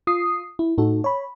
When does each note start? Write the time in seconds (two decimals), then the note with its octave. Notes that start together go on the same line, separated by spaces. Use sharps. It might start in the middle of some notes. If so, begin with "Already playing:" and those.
0.07 F4 D#6 C7
0.59 E4
0.78 A2 D#4 F#4 A4
1.04 C#5 B5